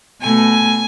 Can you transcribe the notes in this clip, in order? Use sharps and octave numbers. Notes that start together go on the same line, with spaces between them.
B2 A3 G#5